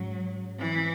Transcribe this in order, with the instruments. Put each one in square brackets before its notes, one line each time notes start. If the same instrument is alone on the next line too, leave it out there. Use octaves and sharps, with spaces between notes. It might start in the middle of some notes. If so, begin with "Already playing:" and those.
Already playing: [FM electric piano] G#2 G#3 C#4 [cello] F#3
[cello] E3